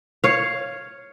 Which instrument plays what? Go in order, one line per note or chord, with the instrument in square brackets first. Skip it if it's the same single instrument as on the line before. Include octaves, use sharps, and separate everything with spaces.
[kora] C#5 F5